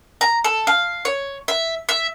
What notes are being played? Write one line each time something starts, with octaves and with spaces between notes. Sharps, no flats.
A#5
A4
F5
C#5
E5
E5